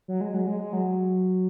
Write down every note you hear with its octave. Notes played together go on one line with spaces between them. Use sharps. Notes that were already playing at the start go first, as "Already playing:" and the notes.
F#3
G#3
F#3
G#3
G#3
F#3